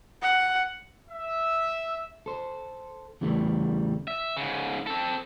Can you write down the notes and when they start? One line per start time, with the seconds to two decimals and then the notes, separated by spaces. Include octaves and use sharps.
0.22 F#5
1.10 E5
2.26 A4 C5
3.21 E2 C#3 E3 G3 A3
4.08 E5
4.37 G#2 C#3
4.87 C4 A4